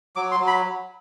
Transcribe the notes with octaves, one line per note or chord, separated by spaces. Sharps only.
F#3 D6
C6
F#3
B5